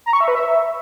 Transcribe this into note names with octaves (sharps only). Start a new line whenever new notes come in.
A#5
C#6
E5
B4
E5